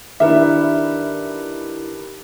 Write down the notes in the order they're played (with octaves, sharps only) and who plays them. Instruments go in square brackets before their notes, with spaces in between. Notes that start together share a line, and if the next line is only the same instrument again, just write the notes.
[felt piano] D#3 D4 E4 [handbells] G4 A#4 B4 [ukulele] E5